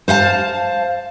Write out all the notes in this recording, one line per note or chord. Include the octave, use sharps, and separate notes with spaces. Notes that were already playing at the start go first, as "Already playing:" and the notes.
C5 F5 F#5 A5